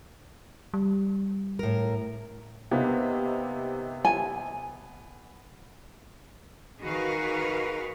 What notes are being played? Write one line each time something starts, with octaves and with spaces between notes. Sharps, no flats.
G3
A2 A#4
C3 A#3 B3 D#4
G#5
D#3 F#4 G#4 A#4 B4 F5